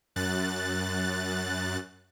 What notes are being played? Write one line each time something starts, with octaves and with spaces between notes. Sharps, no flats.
F#2 F#6 A6